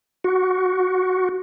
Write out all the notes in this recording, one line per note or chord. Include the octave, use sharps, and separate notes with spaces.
F#4